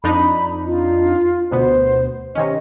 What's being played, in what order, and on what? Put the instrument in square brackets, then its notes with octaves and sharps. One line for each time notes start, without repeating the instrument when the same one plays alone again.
[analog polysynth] F2 D4 D#4 [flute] B5
[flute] F4
[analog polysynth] D2 B2 B3 [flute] C5
[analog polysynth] C3 D#3 C#4 [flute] D#5